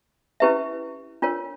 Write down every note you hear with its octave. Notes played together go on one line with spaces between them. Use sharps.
C#4 E4 G4 B4 E5
D4 F4 A#4 C#5